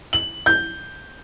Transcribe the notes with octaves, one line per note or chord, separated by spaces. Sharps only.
F#7
G6